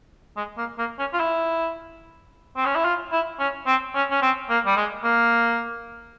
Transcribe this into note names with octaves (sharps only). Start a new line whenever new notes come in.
G#3
A#3
A#3
C#4
F4
E4
C4
C#4
E4
F4
E4
C#4
C4
C#4
C#4
C4
A#3
G3
G#3
A#3